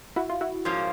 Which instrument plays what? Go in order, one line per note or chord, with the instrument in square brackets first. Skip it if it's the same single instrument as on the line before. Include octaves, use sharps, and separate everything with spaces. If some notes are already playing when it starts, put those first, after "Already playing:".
[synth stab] E4 F#4
F4
E4 F#4
[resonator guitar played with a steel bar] G#2 F3 A#3 C#4 F4